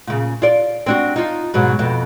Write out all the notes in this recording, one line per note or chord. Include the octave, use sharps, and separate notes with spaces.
A#2 C#3
F4 D5
C4 D4 F#4
D#4 F4
G#2 B2 F#3
F2 B2